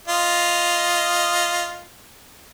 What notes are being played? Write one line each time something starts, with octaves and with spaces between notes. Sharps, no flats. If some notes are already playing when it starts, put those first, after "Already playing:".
F4 D#5